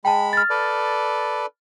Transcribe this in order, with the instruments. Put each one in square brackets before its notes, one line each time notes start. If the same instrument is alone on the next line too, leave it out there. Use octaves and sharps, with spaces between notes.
[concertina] G#3 B5 [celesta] G5 A5
[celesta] F6 A6
[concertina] A4 B4 D5